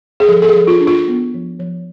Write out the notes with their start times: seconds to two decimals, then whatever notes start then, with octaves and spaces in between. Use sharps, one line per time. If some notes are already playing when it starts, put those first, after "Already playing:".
0.20 G#4
0.28 F3 A4
0.42 A4
0.48 G#4
0.55 F3
0.67 F4
0.80 D4
0.87 F4
1.08 B3
1.34 F3
1.59 F3